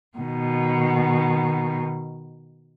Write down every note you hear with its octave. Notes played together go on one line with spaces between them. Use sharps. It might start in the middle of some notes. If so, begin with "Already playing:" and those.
B2 D#3